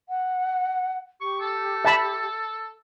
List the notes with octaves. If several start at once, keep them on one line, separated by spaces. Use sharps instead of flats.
F#5
G4 C#6
A4
E5 A5 B5